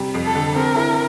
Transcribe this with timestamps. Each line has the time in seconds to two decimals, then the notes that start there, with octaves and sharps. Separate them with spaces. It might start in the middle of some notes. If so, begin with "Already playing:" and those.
Already playing: C3 G3
0.14 F2
0.25 A4
0.35 D3
0.55 C4 A#4
0.76 E4